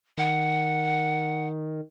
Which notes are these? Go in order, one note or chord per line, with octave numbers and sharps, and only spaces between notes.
D#3 F#5